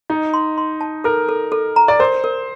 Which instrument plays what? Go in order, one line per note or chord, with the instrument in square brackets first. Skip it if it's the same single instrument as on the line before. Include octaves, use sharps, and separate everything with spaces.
[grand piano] D#4 [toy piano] D#5
[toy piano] C6
C6
A5
[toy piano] A4 [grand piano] A#4
[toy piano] A4
A4
A#5
[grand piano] D5
[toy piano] A#4 [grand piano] C5
[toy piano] A#4